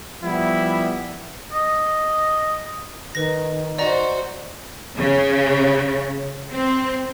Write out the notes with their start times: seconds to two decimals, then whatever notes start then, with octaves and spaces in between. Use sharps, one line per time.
0.22 F3 G3 B3 E4
1.53 D#5
3.15 D#3 B4 A#6
3.78 F#4 C5 D5 D#5 A#5
4.97 C#3
6.49 C4